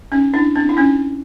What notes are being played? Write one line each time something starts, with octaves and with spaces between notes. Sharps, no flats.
C#4 D#4
D4 E4
C4 D4
E4
C#4 D#4